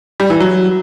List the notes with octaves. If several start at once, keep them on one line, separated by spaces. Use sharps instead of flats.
G3
E3
F#3